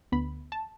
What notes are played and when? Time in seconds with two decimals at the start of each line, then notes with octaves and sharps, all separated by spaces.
0.12 D2 D3 B3 B5
0.52 A5